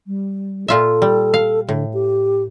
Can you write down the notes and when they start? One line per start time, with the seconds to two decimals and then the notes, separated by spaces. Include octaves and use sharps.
0.07 G3
0.68 A#2 F4 A4 E5
1.02 G3
1.34 F5
1.69 A2 D3
1.94 G4